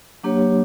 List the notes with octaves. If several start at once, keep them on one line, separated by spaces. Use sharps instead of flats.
F#3 A#3 D4 G4 C#5